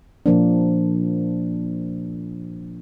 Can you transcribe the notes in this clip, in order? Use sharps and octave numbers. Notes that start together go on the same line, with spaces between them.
A#2 F3 A#3 D4